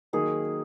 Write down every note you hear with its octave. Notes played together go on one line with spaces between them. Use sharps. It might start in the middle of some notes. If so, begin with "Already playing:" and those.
D#3 F#3 A#3 D#4 G#4